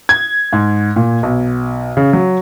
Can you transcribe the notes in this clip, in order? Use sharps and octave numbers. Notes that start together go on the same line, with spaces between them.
G#6
G#2
A#2
B1
C#3
F#3